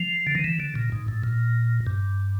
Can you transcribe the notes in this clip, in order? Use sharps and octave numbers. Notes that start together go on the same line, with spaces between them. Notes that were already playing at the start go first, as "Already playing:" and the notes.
Already playing: F3
D3
D#3
E3
D3
A#2
G#2
A2
A#2
G2